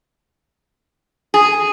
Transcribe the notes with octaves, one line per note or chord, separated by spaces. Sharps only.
G#4